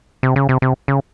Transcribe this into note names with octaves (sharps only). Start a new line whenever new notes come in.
C3
C#3
C3
C3
C#3